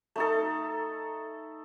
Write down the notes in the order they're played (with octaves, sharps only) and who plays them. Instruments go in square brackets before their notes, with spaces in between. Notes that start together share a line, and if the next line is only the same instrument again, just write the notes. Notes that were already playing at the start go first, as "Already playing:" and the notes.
[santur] A3 D#4 A4